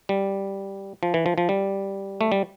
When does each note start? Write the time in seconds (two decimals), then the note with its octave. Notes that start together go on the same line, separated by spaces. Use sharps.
0.09 G3
1.03 F3
1.14 E3
1.26 F3
1.38 F3
1.49 G3
2.21 A3
2.32 G3